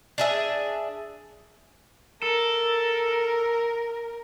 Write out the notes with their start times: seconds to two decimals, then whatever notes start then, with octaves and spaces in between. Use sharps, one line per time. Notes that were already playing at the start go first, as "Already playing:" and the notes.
0.18 D4 G#4 E5
2.22 A4 A#4